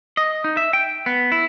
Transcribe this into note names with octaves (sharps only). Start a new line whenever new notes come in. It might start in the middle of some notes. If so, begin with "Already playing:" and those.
D#5
D#4
E5
G5
B3
E4